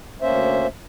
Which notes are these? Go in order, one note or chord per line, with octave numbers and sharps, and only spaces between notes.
D2 A#3 C#4 C5 E5